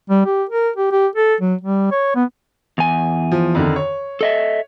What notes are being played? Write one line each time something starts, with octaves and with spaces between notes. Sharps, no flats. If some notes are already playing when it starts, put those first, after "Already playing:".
G3
G4
A#4
G4
G4
A4
F#3
G3
C#5
B3
E2 G#5
F3
F2 D3 D#3
C#5
A4 D#5 E5